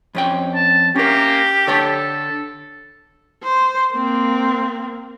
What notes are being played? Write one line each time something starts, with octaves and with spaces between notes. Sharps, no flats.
F2 C#4 G5
A5
A#3 C#4 G4 A#4
D3 A4 C#5 A5
C5
A#3 C4